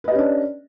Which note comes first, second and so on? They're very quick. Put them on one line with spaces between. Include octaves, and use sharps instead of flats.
B4 D#5 G4 C#4 D4